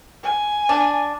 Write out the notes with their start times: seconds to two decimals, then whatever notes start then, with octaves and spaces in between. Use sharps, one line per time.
0.23 G#5
0.69 D4